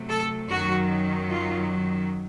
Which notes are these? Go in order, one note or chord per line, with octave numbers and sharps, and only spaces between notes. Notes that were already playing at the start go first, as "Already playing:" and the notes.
Already playing: C3 F#3 A3
A4
F#2 D#3 F#3 F#4
F4